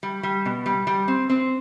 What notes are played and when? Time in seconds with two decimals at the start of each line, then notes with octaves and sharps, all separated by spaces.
0.03 G3
0.23 G3
0.45 B2
0.66 G3
0.87 G3
1.08 C4
1.30 C4